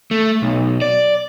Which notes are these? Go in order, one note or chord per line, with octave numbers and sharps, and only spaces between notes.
A3
B1
D5